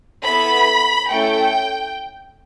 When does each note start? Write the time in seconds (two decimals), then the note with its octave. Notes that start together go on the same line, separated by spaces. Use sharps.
0.24 B3 E4 A4 B5
1.10 A3 C#4 E4 A4 G5